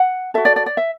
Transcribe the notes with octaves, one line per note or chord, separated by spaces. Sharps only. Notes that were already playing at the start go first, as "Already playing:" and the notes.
Already playing: F#5
F#4 A4 E5
D5
D5
D5
E5